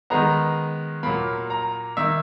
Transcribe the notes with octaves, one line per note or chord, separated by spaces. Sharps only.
D#3 G#3 B3 A#5
A#2 F#3 A#3 B5
A#5
D#3 A#3 E5